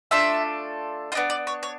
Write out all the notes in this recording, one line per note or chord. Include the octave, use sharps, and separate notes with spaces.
A3 D4 F4 A4 E5
F4 D#5
B3 D4
D5
C#5
C#5